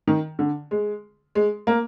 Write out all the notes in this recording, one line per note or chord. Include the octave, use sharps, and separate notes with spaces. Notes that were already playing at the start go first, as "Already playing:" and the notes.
D#3
D3
G#3
G#3
A#3